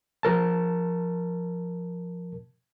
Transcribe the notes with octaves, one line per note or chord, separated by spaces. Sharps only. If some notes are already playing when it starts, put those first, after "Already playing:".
F3 A#4 A5